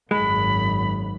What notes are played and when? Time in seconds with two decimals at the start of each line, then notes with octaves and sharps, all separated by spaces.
0.11 G#1 F#2 G#3 B5